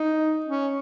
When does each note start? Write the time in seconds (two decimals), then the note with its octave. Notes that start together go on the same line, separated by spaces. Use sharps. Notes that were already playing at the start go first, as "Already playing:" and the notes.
Already playing: D#4
0.45 C#4